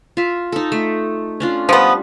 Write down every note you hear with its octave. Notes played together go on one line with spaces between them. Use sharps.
F4 E5
D#4 A4
A3
C#4 D4 F4
F3 G3 B3